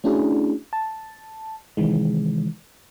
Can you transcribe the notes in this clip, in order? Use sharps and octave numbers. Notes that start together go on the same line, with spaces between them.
A3 C#4 D4 E4 F#4 G#4
A5
C3 D#3 E3 G#3